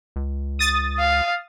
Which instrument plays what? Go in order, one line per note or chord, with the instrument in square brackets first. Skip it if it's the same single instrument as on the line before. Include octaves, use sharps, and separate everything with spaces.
[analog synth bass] C#2
[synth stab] D#6 A6
[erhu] F5